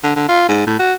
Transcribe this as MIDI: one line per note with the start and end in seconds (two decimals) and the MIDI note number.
0.04 0.15 50
0.16 0.27 50
0.29 0.48 65
0.48 0.62 44
0.67 0.76 45
0.79 0.93 66